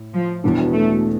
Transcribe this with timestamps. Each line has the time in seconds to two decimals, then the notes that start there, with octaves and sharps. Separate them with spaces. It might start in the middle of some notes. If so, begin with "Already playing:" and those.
Already playing: A2
0.14 F3
0.43 E1 E2 B2 G3 B3 D4
0.73 A3